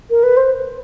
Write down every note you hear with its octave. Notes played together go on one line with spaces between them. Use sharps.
A#4
B4
C5